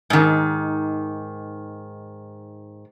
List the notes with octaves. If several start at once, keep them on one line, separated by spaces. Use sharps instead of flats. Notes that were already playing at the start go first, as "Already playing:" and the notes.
G#2 D#3